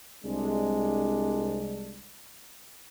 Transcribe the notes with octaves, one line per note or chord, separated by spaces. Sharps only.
C2 G#3 D4